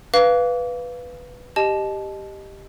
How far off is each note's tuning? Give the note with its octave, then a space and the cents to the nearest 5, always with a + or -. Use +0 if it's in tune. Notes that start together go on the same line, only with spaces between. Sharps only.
B4 +0 F5 +0 D6 -35
G4 +5 D#5 -15 A5 -25